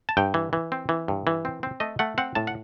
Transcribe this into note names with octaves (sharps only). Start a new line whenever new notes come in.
A5
G2 G5
E3
E3
C4
E3
G2
E3
C4
C4
A3 D#5
A3 F#5
C4 F#5
A2 A5
F#5